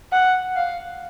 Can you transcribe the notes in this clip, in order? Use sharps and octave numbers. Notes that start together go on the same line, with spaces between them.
F#5
F5